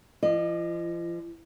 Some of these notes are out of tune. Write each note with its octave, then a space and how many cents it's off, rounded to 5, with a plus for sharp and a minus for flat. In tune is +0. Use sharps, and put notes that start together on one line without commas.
F3 -45 D#5 -30